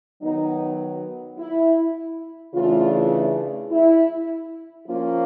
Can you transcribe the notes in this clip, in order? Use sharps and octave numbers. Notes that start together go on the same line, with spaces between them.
D#3 F#3 B3 D#4
E4
C#3 E3 A3 D4 F4
E4
F3 A#3 C#4 F4